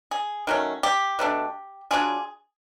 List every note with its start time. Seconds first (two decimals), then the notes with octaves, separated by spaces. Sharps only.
0.11 G#4
0.47 D#3 F#3 A3 C#4
0.83 G4
1.19 B2 F#3 A3 D4
1.91 F#3 A#3 D4 F4 G#4